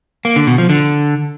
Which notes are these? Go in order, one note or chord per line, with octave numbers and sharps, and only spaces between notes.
A#3
D3
B2
F3
D3